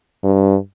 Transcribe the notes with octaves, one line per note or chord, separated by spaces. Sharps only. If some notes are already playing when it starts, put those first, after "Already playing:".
G2